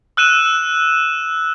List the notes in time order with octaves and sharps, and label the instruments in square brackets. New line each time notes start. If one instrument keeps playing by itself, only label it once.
[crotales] E6 F#6 D#7 E7